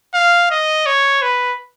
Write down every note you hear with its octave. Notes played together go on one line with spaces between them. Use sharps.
F5
D#5
C#5
B4